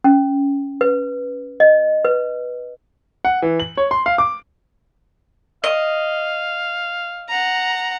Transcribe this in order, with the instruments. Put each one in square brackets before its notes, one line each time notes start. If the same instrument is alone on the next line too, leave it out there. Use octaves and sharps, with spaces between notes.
[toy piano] C#4
B4
D#5
B4
[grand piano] F#5
E3
F#7
C#5
C6
F5
D6
[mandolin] D#5 [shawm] F5
[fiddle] F#5 A#5